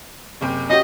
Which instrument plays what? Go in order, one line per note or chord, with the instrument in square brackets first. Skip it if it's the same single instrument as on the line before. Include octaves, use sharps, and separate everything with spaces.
[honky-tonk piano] F#1 C3 G5
[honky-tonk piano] C#4 F#4 G4 [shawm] D#5